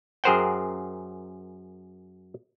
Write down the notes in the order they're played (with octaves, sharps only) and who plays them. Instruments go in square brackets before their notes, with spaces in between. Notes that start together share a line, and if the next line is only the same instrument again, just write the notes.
[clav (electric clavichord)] F#2 G#4 A#4 C5 F#5 G5